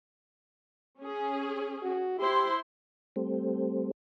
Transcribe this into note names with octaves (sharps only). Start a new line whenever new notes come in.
C#4 G#4
F#4
E4 G4 C5 C6
G3 A3 C4